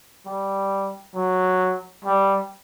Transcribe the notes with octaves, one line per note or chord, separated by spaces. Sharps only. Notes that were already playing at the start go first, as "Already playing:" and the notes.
G3
F#3
G3